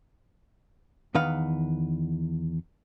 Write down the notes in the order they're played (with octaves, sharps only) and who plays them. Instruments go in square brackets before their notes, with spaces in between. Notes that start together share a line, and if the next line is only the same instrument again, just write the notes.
[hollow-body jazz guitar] E2 D#3 B4 F5 F#5